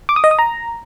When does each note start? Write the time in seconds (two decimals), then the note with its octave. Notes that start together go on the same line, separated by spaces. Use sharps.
0.09 D6
0.16 D#6
0.24 D#5
0.31 D#6
0.39 A#5